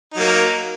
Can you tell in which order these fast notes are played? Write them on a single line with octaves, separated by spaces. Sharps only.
D#4 F#3 A#3